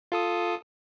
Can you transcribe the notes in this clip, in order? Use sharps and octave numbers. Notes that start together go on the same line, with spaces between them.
F4 A4 D#6